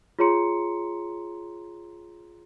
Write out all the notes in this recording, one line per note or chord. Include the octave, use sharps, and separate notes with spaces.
F4 G#4 C#5 A#5 C6 C#7